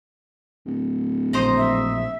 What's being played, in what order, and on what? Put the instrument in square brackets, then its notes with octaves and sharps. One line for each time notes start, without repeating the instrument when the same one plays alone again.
[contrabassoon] D1
[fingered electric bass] A#1 [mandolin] C5 D#5 A#5
[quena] E5